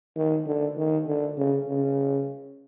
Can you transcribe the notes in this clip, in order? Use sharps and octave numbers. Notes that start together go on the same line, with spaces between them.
D#3
D3
D#3
D3
C#3
C#3